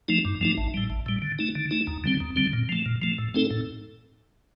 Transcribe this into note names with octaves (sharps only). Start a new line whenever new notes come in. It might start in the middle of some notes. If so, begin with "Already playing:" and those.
F3 A3 D#4
G2
F3 A3 D#4
A1
A2 G3
A1
A2 G3
D3
A3 D#4
D3
A3 D#4
D#2
D3 G3 C4
D#2
D3 G3 C4
A#2
F3 A3
A#2
F3 A3
A2
A3 C4 D#4 A4
A2